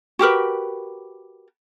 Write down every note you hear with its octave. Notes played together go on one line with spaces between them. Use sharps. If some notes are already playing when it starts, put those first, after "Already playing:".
F#4 G4 A#4 B4